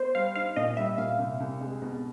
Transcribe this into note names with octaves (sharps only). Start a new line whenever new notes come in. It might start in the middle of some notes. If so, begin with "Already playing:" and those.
Already playing: B3 C5
G3 F5
D#4 F5
A#2 D#5
G3 E5
A#2 F5
C2
C2
G#3
B2